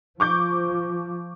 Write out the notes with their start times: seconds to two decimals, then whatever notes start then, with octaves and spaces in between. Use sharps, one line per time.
0.20 F3 C#6 D6 G6